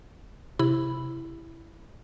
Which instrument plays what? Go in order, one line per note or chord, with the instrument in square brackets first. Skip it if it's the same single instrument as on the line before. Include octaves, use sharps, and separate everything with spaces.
[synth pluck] C3 E4 B5